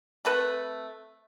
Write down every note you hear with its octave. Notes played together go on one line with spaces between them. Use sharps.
A3 C4 A4 B4